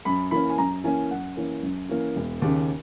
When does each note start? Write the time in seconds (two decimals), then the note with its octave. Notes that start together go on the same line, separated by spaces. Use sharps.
0.05 F#2 B5
0.31 E3 A#3 C#4 B5
0.49 G#5
0.58 F#2 A#5
0.84 E3 A#3 C#4 G#5
1.11 F#2 F#5
1.37 E3 A#3 C#4
1.63 F#2
1.89 E3 A#3 C#4
2.16 E1
2.42 D#2 C#3